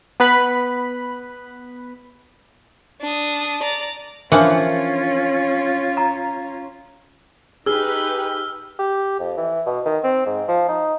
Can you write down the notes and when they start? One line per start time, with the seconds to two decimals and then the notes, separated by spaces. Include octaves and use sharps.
0.20 B3 B4 B5
3.01 D4 D#6
3.63 D5 A#5
4.32 E3 F3 C#4 D4 F4 A#4 F#5
5.97 A#5
7.66 D#4 G4 G#4 B4 E6 F6 G7
8.79 G4
9.20 F2
9.37 E3
9.66 B2
9.85 D#3
10.04 C4
10.26 G#2
10.48 F3
10.68 D#4